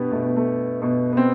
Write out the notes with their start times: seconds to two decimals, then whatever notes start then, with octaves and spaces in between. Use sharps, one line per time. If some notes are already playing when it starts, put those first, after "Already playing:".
Already playing: B2 B3 D4 G4
0.11 B2 A3
0.24 B3
0.36 A3
0.82 B2 B3
1.13 B3
1.17 C4